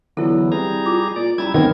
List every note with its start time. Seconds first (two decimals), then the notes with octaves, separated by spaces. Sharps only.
0.17 E2 D3 E3 F#3 E4 A4
0.52 C2 G3 G#4 A#5
0.85 F4 D6
1.16 A#2 D5
1.38 F#1 G3 E4 A#5 B5 E6 G#6
1.54 D#3 F#3 B3 C4 A#4 G#6